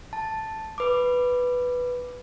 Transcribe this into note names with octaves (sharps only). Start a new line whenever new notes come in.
A5
B4 D6